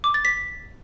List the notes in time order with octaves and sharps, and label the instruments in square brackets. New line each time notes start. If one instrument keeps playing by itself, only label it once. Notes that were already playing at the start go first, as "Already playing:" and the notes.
[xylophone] D6
A6
B6